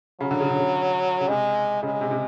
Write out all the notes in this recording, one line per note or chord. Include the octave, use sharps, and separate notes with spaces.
C#3 F#3
D3
C#3
D3
C#3
C#3
C3 G#3
C#3 G#3
C3
C3